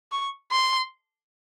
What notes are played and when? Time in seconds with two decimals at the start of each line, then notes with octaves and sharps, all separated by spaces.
0.12 C#6
0.51 C6